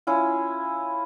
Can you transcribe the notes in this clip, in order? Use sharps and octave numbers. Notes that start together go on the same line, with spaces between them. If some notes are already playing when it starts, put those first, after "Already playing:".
C#4 E4 F4